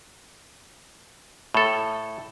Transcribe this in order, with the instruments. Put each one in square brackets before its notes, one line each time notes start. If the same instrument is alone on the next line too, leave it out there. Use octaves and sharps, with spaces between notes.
[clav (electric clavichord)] A2 A4